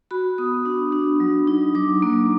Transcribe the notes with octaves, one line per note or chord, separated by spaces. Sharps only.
F#4 B5
B3 D#6
D4
D4
F#3
D#4
F#3 D6
A#3